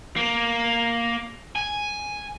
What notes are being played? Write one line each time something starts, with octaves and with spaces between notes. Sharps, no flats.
A#3
G#5